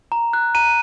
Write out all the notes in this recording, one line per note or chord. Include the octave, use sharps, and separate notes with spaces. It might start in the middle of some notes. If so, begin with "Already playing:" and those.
A#5
F#6
A#5 D#7